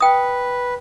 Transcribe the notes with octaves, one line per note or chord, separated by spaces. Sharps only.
B4 G5 D#6